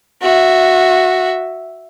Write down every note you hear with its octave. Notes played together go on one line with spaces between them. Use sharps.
F#4 E5